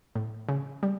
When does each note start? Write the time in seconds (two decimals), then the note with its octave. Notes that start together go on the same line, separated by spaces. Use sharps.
0.15 A2
0.49 C#3
0.83 G3